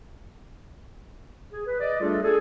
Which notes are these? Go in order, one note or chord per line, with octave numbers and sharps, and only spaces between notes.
G#4
B4
D5 D#5
G3 A3 D4 F4 G#4 A4
G#4 A4